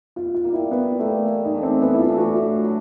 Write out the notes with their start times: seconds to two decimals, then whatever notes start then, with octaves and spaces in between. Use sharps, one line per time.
0.16 B2 F4
0.35 F4
0.44 G3 A#3
0.53 E4
0.71 B2 B3
0.99 G3 A3 A#3
1.26 E3
1.45 D#4
1.54 A3 D4
1.63 C4
1.82 E3 B3
1.94 E4
1.99 F4
2.08 A3 D4
2.18 F#4
2.37 A2
2.64 F#3